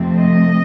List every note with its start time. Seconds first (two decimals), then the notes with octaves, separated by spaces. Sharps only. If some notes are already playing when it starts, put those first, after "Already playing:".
Already playing: F2 C3 F3 A3 C4
0.17 D#5